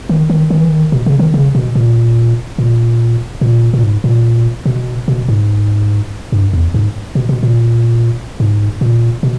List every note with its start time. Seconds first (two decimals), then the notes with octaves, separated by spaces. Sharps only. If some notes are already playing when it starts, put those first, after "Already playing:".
0.09 D#3
0.30 D#3
0.50 D#3
0.60 E3
0.69 D#3
0.92 B2
1.06 C#3
1.19 D#3
1.34 C#3
1.55 B2
1.75 A#2
2.58 A#2
3.41 A#2
3.74 A#2
3.83 G#2
4.04 A#2
4.66 B2
5.08 B2
5.28 G#2
6.32 G2
6.54 E2
6.74 G#2
7.15 B2
7.29 B2
7.43 A#2
8.40 G#2
8.81 A#2
9.23 B2